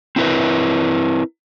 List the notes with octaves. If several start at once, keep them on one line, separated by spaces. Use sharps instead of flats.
C4 E4 A#4 B4